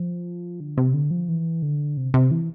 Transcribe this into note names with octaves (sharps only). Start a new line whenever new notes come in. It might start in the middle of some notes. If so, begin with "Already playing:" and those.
Already playing: F3
D3
C3
D3
F3
E3
D3
C3
C3
E3